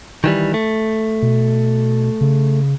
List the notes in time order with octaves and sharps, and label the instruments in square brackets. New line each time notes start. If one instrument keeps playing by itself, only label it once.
[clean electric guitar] D#3 E3 G3
A3
[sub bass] B2
C#3